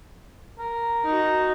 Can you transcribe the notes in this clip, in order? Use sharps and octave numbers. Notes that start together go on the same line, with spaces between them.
A#4
D#4 F#4